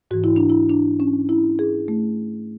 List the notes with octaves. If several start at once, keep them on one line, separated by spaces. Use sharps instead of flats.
G#2 E3 F#4
E4
D4
E4
D4
C#4
E4
G#4
A3